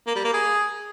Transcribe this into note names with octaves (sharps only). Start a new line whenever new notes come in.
A#3
G3
A#3
G#4